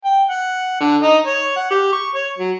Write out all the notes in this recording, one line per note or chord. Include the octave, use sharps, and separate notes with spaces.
G5
F#5
D3
D#4
C#5
F#5
G4
C#6
C#5
F#3